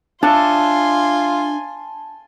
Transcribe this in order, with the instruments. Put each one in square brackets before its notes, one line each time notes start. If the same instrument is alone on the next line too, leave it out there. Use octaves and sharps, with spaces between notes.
[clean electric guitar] D4 C#5 E5 [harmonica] F4 [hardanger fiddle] G#5 C6 [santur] A5